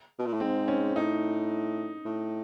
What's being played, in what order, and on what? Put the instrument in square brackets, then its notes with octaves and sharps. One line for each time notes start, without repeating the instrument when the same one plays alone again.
[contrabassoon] B2
A#2
A2
[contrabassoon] G#2 [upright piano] C4
[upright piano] C#4
[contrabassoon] A2 [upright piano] D#4
[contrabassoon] A2